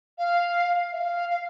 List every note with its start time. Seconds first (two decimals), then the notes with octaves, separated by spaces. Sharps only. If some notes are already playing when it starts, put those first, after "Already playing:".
0.18 F5
0.92 E5
0.97 F5
1.30 F5